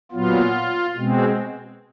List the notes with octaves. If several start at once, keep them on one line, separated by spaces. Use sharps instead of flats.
A#2 F#3 B3 F4
B2 G#3 C4